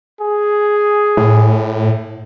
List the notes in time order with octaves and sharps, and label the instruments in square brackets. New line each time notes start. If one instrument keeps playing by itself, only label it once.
[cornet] G#4
[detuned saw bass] A2